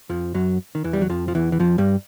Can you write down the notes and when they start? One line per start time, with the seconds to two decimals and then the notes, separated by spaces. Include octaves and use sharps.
0.10 F2 F3
0.34 F#2 F#3
0.75 D#3
0.84 E2 E3
0.93 G3
1.01 F#3
1.09 F2 F3
1.28 F3
1.35 E2 E3
1.52 E3
1.60 F2 F3
1.78 G2 G3